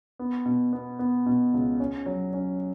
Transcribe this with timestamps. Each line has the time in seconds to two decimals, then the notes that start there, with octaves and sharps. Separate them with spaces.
0.19 B3
0.46 B2
0.73 B3
0.99 B3
1.26 B2
1.53 C#2
1.80 C#4
2.06 F#3
2.33 C#4